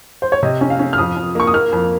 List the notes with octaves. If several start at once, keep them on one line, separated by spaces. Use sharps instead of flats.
C5
C#5
C3 D#5
C#4
F5
C#4
F6
F2 D#6
F2
A#3 C#6
D#6
A#3 F6
F2